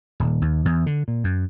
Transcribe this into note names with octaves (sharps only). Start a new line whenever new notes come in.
D#1
D#2
E2
D3
A#2
F#2